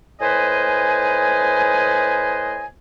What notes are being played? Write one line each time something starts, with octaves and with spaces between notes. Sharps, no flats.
A2 B4 C5 D#5 G#5